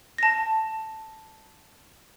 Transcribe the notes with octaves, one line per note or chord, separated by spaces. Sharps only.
A5 A#6